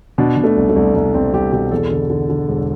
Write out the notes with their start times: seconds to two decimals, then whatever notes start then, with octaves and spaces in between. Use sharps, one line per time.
0.18 B2 D4
0.37 B2
0.44 A3
0.57 C2
0.69 A3
0.76 C2
0.95 C2
1.14 C2 C4
1.33 C2 G4
1.53 B2 G4
1.71 E2 A4
1.91 D3
2.10 D3
2.29 D3
2.48 E1